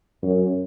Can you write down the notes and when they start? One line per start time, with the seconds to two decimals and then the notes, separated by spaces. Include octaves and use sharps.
0.23 F#2